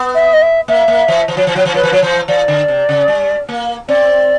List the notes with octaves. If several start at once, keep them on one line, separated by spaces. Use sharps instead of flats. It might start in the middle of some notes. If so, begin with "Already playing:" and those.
Already playing: B3
E5
D#5
E5
A#3 E5
A#3
E3
E3
F3
E3
F3
E3
F3 B4
E3
F3
E3 C5
E3 D5
D3
C3
C#3
G3
A#3
C4 D5